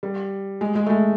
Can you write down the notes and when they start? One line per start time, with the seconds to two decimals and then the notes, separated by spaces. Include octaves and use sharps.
0.03 G3
0.61 G#3
0.75 G#3
0.86 A3
0.90 G#3